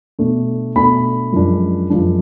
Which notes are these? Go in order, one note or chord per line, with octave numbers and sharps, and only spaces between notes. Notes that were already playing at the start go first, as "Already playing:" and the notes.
B2 A3 D4
B2 A3 D4 B5
F#2 F3 G#3 D4
F#2 F3 G#3 D4